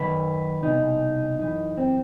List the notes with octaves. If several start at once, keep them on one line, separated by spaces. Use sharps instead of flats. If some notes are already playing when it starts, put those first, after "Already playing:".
Already playing: F#2 D#3 B4
C2 B2 D#4
F#2 E3 D#4
C4